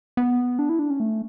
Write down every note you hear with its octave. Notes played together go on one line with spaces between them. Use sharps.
B3
D4
E4
D4
C#4
A3